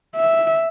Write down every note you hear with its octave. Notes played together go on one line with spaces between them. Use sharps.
E5